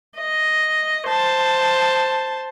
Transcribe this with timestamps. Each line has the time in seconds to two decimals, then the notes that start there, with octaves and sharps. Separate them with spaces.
0.17 D#5
1.07 C5 A5